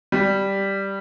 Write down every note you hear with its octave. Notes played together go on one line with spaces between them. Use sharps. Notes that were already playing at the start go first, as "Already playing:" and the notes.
G3